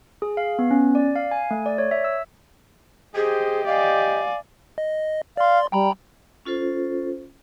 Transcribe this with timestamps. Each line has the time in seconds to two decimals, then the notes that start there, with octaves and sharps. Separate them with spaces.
0.22 G#4
0.37 F5
0.59 B3
0.71 C#4
0.95 D5
1.15 F5
1.31 G#5
1.51 A3
1.66 D5
1.78 C#5
1.91 E5
2.04 E6
3.15 G4 G#4 C5 D#5
3.66 D5 D#5 F5 G#5
4.78 D#5
5.37 D5 F5 C6
5.72 G3 G5 A#5 B5
6.45 C#4 F4 A4 C5